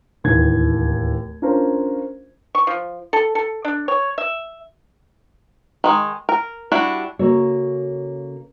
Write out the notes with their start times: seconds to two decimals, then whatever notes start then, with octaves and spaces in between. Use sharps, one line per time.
0.24 D1 D#2 E3 G#6
1.42 C#4 D4 F4 A#4 C5
2.55 C#6
2.67 F3
3.13 A4
3.35 A4
3.65 D4
3.88 C#5
4.18 E5
5.84 D#3 G#3
6.29 A#4
6.72 G3 D4 E4 F#4
7.19 C#3 A#3 F#4 A4 C#5